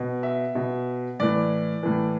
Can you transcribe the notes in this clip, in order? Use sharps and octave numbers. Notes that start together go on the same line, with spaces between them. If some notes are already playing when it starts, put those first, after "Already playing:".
Already playing: B2
E5
B2
A2 E3 D5
A2 E3